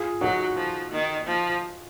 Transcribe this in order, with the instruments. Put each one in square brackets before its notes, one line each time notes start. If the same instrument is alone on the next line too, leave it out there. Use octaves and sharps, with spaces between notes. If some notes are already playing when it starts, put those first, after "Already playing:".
Already playing: [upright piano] F4 G#4
[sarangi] F#3 [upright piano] D#4 F#4
[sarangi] F3
D#3
F3